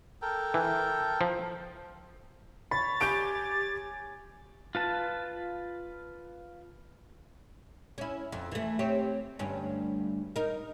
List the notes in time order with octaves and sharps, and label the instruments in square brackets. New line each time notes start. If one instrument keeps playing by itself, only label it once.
[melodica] A4 A#4 G5
[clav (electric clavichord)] E3
F3
[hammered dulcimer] C#5 [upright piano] B5 [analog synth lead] A6
[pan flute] G4 [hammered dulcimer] G#5 [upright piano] G6 D7
[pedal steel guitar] F4 B4 A5
[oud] C#4 E4
F2
E3 A3
C4 G4 C#5
D2 G2 C#4
D#4 A#4